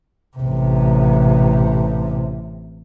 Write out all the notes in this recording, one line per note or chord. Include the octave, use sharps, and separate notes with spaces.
A1 C3